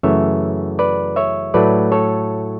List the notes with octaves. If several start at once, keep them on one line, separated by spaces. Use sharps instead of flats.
F#2 C#3 E3 A3 C#5 E5
B4 D5
C#5 E5
A2 F#3 A3 B4 D5
A4 C#5